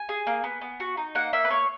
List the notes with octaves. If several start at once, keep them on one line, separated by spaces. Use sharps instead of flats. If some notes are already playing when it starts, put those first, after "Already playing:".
Already playing: G#5
G#4
A#3
B3
B3
F#4
D#4
A#3 F#5
A#3 E5
B4
A#3 C#5